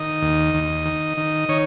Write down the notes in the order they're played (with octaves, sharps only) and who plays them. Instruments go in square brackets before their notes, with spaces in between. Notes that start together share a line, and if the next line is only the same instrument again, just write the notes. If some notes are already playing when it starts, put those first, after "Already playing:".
Already playing: [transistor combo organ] D#3 D#5
D#2
D#2
D#3
D#3
D#3 C#5